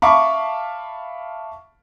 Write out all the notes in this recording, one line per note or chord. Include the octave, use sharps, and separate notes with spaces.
E5 F5 A5 B5 C#6 D6